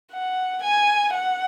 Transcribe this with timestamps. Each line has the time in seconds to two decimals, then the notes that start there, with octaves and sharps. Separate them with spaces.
0.12 F#5
0.63 G#5
1.14 F#5